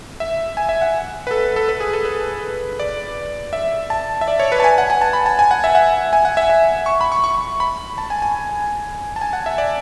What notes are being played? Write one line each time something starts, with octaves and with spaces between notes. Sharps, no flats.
E5
G#5
E5
F#5
B4
A4
A4
B4
G#4
A4
B4
D5
E5
A5
E5
D5
C#5
B4
A5
G#5
F#5
G#5
A5
B5
A5
G#5
F#5
E5
F#5
G#5
F#5
E5
E5
C#6
B5
C#6
C#6
B5
A5
G#5
G#5
A5
G#5
F#5
E5
D5